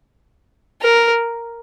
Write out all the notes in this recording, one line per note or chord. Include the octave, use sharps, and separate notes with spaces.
A#4